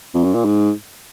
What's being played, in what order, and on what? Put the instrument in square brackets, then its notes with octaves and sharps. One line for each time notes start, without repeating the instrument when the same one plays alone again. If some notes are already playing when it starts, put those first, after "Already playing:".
[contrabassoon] F2
F#2
A#2
G#2